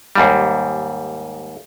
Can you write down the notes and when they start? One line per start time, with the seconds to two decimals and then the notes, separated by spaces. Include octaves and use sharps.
0.15 D#2 G#2 G3